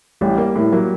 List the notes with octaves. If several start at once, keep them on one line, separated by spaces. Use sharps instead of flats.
A1 G3
A#3
A2
F#3 A#3